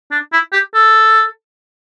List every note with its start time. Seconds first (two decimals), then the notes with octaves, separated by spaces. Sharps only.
0.12 D4
0.33 E4
0.53 G4
0.74 A4